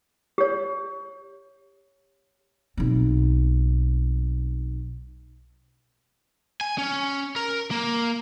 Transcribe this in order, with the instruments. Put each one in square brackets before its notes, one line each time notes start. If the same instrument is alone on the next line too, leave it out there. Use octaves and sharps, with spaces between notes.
[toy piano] G4 C#5
[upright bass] B1 C4
[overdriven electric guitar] G#5
C#4
A#4
A#3